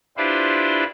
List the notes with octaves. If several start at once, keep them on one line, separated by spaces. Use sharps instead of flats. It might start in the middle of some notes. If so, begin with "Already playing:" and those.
D4 E4 F4 G4 B4 C5